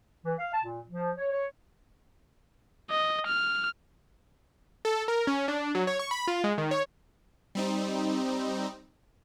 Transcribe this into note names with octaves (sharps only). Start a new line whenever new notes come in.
E3
F5
A5
A#2
F3
C#5
C#5
D#5
F6
A4
A#4
C#4
D4
F#3
C#5
C#6
B5
F4
G#3
D#3
C#5
G3 C4 D#4